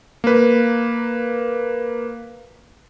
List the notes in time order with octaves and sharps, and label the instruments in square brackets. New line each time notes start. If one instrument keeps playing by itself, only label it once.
[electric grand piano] A#3 B4